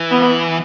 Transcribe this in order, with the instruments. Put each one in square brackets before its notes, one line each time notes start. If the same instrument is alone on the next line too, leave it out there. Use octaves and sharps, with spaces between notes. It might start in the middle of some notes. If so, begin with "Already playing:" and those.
Already playing: [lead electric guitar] E3
[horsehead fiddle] B3